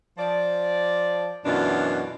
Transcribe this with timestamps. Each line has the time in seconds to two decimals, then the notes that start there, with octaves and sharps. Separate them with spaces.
0.18 F3 D5
1.45 F#2 B2 E3 D4 F4